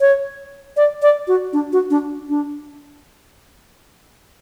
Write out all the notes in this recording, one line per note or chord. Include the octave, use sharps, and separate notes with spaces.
C#5
D5
D5
F#4
D4
F#4
D4
D4